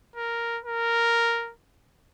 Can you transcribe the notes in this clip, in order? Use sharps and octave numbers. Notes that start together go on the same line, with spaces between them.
A#4
A#4